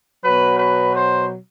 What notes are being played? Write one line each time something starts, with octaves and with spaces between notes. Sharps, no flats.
B2 F#3 B4
B4
C5